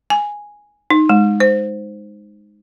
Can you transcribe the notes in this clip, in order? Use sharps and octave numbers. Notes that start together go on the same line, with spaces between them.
G#5
D#4
G#3
C5